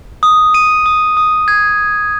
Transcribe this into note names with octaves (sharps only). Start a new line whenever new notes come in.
D#6
D#7
D#6
D#6
G#6